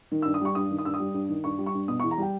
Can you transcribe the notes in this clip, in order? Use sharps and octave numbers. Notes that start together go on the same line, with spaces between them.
D#3
E6
G2
D#6
G3 C#6
G2 D#6
D#3
D#6
G2 E6
D#6
G3
G2
D#3
G2 C#6
G3
C#6
G2
B2 D#6
C#6
E2
A#5
G3 G5